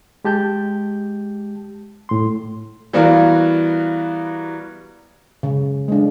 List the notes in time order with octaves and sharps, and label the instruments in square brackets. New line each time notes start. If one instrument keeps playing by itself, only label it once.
[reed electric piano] G#3 G4 A5 G6
A2 C6
[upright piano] E3 G3 B3 F#4 A#4 F5
[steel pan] C#3
G#3 D4